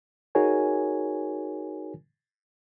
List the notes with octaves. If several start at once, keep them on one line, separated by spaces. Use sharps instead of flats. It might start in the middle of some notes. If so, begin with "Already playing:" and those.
D#4 F#4 G#4 A#4 C#5 G#5